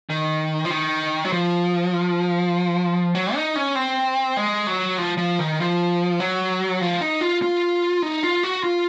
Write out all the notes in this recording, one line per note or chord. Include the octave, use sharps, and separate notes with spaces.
D#3
F3
D#3
F#3
F3
F#3
D#4
C#4
C4
G#3
F#3
F3
F3
D#3
F3
F#3
F3
D#4
F4
F4
D#4
F4
F#4
F4